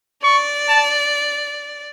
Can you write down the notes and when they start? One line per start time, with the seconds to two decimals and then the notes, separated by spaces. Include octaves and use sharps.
0.23 D5 C#6
0.68 A5